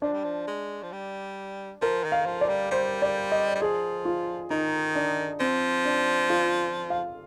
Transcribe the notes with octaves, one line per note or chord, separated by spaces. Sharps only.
F3 D4
G3
F3
G#3
F3
G3
F3 A#4
D#3
F5
F3
D5
G3
G3 C5
D5
D#5
G3
F3 G#4
F4
D#3 D#4
D4
F3 C4
D4
F4
F5